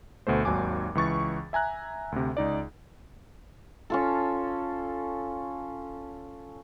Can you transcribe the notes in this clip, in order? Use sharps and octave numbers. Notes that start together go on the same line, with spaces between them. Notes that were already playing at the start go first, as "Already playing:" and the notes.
D2 B2 A3 C5
G#1 D#2 F#3 G#5 D6
C#2 E3 C#6 A6
E5 G#5 A#5 F#6
D2 C3
C#2 D#4 D5
C#4 F4 A4